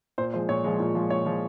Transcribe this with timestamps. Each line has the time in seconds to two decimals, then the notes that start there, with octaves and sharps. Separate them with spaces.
0.18 A#2 C5
0.34 F3 G#3 C5
0.49 A#2 C#5
0.64 F3 G#3
0.80 A#2
0.95 F3 G#3
1.10 A#2 C#5
1.26 F3 G#3